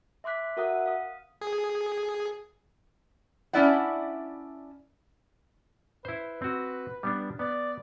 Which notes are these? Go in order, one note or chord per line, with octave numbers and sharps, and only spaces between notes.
E5 C6 D6 F#6 B6
F#4 A#4 E5 F#5 D#6 F#6
F5 D#6
G#4
C#4 D4 E4 D5 E5 F#5
E4 B4 C5
C4 F#4
G3 B3 D4
B3 D5